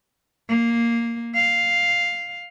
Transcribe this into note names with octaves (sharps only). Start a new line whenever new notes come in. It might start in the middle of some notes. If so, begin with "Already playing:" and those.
A#3
F5